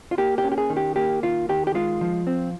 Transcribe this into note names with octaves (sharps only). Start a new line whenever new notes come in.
F4
A#3 G4
G4
C#4
G4
G#4
D#3
G4
A#3 G4
D#3 F4
D#3 G4
G4
G#3 F4
F3
C4